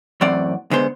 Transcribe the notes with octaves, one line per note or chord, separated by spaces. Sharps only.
F#2 A2 E3 C4 D5 F#5
D3 G#3 B3 C5